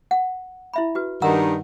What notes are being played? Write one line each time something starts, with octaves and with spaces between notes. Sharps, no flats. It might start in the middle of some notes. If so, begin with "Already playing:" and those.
F#5
E4 E5 B5
F#4 B4
G2 D#3 F#5 A#5 E6